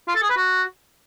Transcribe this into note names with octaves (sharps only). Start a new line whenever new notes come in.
F4
A4
G#4
B4
F#4